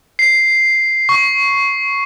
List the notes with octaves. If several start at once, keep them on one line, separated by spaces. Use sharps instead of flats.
C7
C#6